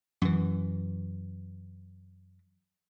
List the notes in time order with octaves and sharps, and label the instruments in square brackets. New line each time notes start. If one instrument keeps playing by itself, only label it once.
[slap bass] F#2 E3